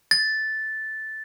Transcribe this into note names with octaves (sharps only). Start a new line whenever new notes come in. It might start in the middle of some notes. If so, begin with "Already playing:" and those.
A6